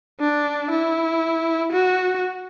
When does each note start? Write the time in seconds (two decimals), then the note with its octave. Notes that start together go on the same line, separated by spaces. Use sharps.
0.21 D4
0.71 E4
1.73 F#4